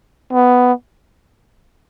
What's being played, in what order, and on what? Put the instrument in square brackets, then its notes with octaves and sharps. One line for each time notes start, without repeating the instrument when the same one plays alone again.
[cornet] B3